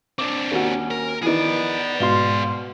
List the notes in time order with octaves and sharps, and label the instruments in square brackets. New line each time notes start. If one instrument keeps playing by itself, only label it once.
[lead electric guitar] C4 D4 [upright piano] D6
[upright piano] D#2 F#4 [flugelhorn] C#4
[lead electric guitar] A#4
[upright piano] D#3 E3 [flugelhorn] B3 [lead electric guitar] G#4 D5
[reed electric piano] G#2 C6 [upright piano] B2 G7 [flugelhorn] F5